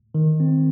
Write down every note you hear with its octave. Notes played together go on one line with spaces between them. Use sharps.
D#3
C4